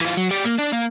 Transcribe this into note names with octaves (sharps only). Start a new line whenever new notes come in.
E3 F4
F#3
G3 D5
A#3
D4
A#3